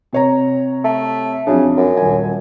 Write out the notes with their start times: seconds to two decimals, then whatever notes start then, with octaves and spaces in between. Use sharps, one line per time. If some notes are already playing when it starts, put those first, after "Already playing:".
0.13 C3 C#5 A#5
0.84 A3
1.47 F2 C#3 F#3 D4
1.77 F#2
1.97 D#1 G#5